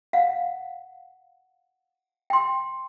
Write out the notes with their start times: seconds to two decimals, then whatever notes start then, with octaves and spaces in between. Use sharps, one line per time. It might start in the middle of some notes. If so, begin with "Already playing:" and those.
0.13 F5 F#5
2.30 G5 C6